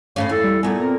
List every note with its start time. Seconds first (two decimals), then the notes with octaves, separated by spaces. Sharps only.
0.16 A2 A3 C#4 F5 C7
0.29 E2 E4 A4
0.44 G3
0.63 A#2 A3 B3 G#5
0.81 C4 A#4